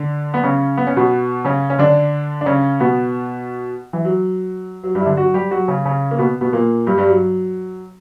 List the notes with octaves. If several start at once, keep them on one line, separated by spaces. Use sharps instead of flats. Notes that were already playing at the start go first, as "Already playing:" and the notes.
Already playing: D3 D4
B3
C#3 C#4
B3
C#4
B2 B3
C#3 C#4
C#4
D3 D4
D4
C#3 C#4
B2 B3
E3
F#3
F#3
G2 G3
E4
D3 D4
F#3 F#4
G3 G4
F#3 F#4
C#3 C#4
C#3 C#4
A#3
B2 B3
B2 B3
A#2 A#3
G2 G3
G2 G3
F#3